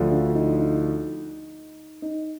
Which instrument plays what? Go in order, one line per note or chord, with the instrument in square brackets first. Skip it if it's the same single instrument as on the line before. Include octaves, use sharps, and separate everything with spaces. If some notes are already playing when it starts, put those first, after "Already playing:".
Already playing: [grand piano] D2 D3 F3
[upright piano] D4
D#4
D#4
D#4